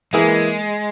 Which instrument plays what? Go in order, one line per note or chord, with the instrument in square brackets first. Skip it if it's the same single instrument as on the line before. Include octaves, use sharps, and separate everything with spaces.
[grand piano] E3 A#3 E4 G#4 [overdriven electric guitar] G#3